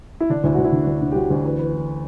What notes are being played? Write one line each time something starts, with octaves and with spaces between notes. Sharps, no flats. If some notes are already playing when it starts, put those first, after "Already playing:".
E4
D3 D4
D2 E4
D2 F#4
E4
D3
D2
D3
G4
D2 F#4
D2 G4
E3 B4
E3 B4
E3